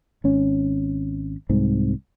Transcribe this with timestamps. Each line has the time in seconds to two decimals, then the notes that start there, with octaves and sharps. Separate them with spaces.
0.24 G#1 C#4
1.49 C2 G#2 C4